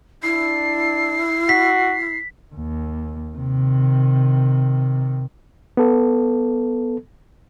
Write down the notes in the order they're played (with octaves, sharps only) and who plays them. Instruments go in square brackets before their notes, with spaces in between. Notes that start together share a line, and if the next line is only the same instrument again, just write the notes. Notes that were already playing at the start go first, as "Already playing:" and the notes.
[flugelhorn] D4 [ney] E4 [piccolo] C7
[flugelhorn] F#4 [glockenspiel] B6
[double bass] D#2
C3 D#3
[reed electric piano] B3 A4